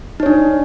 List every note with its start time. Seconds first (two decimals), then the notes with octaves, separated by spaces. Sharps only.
0.20 D#4
0.23 C#5
0.26 D4